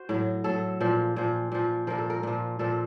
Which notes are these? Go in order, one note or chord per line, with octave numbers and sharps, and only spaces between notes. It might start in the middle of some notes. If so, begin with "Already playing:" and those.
Already playing: F#4 C5
A2 F#3
A2 F#3 A4
A#2 F3
A#2 F3
A#2 F3
A#2 F3 A#4
A4
A#4
A#2 F3
A#2 F3 A4